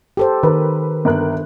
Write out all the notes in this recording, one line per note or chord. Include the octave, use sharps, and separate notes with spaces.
G4 A4 C5
D#3 A#4 B4
G1 A#4 F#6